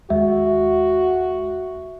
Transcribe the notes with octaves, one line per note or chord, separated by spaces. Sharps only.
D#2 G#3 F#4 E5